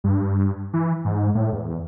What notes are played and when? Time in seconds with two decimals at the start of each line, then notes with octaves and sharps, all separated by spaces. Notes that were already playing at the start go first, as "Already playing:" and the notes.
0.04 G2
0.73 E3
1.05 G#2
1.35 A2
1.52 E2